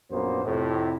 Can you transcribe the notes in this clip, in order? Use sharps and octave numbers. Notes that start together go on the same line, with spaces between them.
A#1 F#2 A#3 B3 F#4 C5
F2 A2 C3